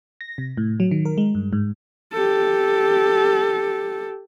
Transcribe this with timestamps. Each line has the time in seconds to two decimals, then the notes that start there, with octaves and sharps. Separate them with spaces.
0.21 A#6
0.38 C3
0.57 A2
0.80 F#3
0.91 D#3
1.05 A#4
1.18 G#3
1.35 G2
1.53 G#2
2.14 G4 A4